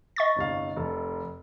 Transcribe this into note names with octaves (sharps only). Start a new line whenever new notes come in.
D#5 C#6 A6
G1 C2 F5
F1 A4